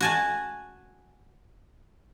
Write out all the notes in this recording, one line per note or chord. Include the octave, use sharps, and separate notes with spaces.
F#4 G#5 A5